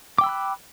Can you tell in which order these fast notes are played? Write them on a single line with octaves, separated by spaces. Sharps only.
D6 G5 E6 B5 F#6